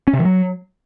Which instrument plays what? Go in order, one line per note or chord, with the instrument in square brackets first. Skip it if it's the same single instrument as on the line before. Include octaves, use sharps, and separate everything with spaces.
[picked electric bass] C#4
C3
E3
F#3